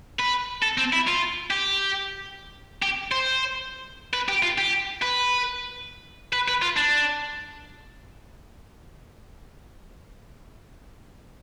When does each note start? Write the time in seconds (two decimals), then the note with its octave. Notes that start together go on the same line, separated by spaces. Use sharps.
0.20 B4
0.63 A4
0.78 C4
0.93 E4
1.07 F4
1.50 G4
2.82 G4
3.11 C5
4.14 B4
4.29 G4
4.43 F4
4.58 G4
5.02 B4
6.33 B4
6.48 B4
6.62 F4
6.77 D4